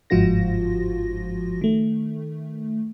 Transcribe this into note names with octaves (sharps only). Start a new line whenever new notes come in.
G1 G#2 F3 F4 F#4 A#6
D#3 A3